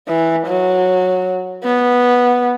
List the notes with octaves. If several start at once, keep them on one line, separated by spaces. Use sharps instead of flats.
E3
F#3
B3